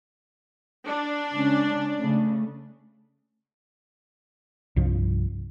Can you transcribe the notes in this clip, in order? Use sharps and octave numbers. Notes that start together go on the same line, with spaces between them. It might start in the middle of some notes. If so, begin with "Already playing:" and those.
D4
C#3 G#3 C#4
C#3 A3
C2 G2 F3